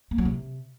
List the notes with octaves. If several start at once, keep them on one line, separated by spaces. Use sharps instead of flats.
A#3
F#3
C3